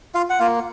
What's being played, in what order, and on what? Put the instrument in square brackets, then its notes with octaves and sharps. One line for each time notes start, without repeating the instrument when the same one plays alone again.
[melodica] F4 F5
F#5
A#3 F4 F5